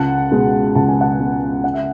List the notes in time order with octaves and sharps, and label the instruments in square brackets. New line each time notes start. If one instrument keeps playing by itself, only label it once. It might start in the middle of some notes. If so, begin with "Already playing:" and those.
Already playing: [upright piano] C#2 F#5 A5
B2 G#3
C#2 A5
G#5
F#5 A5
B2 G#3
C#3 F#5
E5